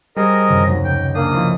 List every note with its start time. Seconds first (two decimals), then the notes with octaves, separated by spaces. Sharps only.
0.16 G3 G#4 A#4 C5 D#5 C#6
0.48 F#2 C3 D#3
0.67 D#2 F#3 A#6
0.85 C#2 G5
1.15 A#3 D4 D#5 F5 G#5 D#6
1.34 F3 E4